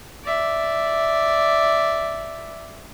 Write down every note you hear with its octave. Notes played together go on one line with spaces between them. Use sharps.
D5 E5